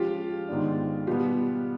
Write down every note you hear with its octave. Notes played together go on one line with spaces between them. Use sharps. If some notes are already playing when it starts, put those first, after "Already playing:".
Already playing: F3 G#3 C#4 F4 G4
G#2 D#3 G#3 B3 D4
B2 G3 B3 F4 G4